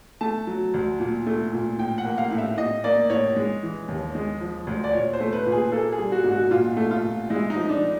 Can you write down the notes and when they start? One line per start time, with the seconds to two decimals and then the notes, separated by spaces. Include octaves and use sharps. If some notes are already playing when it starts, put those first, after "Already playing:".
0.21 A3 A5
0.47 F#3
0.74 D2
1.00 A#2
1.27 A3
1.53 A#2
1.78 A2 G5
1.98 F#5
2.05 A#3
2.18 F5
2.31 A2
2.38 E5
2.57 A2 D#5
2.84 A#3 D5
3.10 A2 C#5
3.36 G#3
3.63 E3
3.88 D#2
4.15 G#3
4.41 F3
4.67 D2
4.84 D5
4.93 A#2 C#5
5.14 C5
5.20 A3
5.33 B4
5.46 A#2
5.52 G#4
5.72 A#3 A4
5.92 G#4
5.98 G3
6.12 F#4
6.24 G#2
6.32 F#4
6.51 A#2 F4
6.77 A3
6.91 F4
7.03 A#2
7.30 G#3 E4
7.50 D#4
7.56 F3
7.69 D4